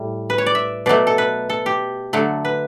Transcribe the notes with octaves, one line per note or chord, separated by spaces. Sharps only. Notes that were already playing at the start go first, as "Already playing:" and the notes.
Already playing: A2 G3
B4
C#5
D5
E5
B2 F#3 A3 D5
A4
B4
A4
G4
D3 F#3 A3
B4